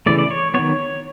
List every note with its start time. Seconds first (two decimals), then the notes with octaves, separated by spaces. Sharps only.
0.06 C#3 E3 A3 D5
0.19 D5
0.31 C#5
0.54 D#3 F#3 B3 C#5